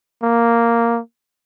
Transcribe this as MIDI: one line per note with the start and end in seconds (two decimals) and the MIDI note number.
0.23 1.00 58